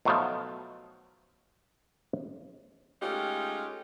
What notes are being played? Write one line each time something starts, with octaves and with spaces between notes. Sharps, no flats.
B2 F3 F#3 A3 D#4 F4
G#3 A3 C#4 D#4 F4 G4